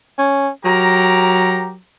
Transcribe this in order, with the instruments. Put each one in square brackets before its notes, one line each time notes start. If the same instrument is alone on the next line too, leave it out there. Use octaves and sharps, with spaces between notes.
[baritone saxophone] C#4
[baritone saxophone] F#3 [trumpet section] G4 A#4 A#5